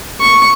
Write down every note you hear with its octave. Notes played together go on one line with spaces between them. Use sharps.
C#6